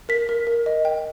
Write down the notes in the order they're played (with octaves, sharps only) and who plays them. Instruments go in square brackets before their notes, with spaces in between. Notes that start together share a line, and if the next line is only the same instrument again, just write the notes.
[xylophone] A#4 B6
A#4
A#4
D#5
G5